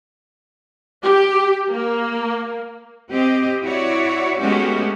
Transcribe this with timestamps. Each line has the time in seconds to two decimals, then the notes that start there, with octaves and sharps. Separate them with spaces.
1.02 G4
1.70 A#3
3.11 C4 G4 D#5
3.64 E4 F#4 C#5 D5
4.39 G#3 A3 B3 C#4 F#4 G4